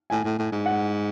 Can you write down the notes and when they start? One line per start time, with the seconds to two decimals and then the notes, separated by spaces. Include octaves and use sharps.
0.10 A2 G#5
0.25 A2
0.38 A2
0.52 G#2
0.66 F#5